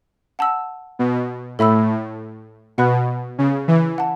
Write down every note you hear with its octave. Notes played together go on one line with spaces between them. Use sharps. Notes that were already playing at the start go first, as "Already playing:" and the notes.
F#5 A5 E6
B2
A2 A4 E5 B5 E6
B2 B4 F#5 B5 F#6
C#3
E3
F#5 A5